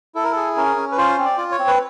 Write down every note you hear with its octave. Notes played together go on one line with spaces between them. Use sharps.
E4 A4
A#4
G#4 A4
C#4 A#4
C#4
B4
F4 C5
C4
D5
F4
C#5
C4
B4